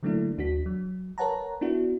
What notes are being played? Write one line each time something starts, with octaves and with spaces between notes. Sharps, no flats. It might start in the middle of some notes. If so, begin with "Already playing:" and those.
D3 F#3 A3 A#3 D4 E4
D#2 D4 F#4 B6
F#3
A#4 B4 C#5 F#5 A5 A#5
B3 D4 E4 F#4